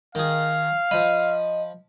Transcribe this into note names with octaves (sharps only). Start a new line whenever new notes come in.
D#3 G#4 F5
F3 D#5 B5